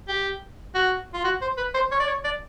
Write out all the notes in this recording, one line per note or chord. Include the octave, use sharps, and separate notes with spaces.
G4
F#4
F4
F#4
C5
B4
C5
C#5
D5
C#5
D5